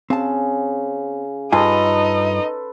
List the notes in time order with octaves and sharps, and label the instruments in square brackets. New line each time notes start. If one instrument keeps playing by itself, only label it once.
[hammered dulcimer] C#3 [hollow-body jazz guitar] C4 A5
[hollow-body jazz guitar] G2 F4 G#5 [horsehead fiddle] D#4 D#5 [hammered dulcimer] A4 B4 C6